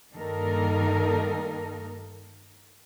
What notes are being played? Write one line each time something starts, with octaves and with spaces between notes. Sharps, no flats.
G2 D#3 A#3 D#4 A4 A#4